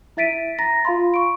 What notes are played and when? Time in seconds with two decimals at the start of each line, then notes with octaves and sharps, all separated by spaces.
0.17 E4 E5 A6 B6 D7 D#7
0.59 A#5 A6 A#6
0.85 F4 F5 B5 C6
1.14 C#6 D7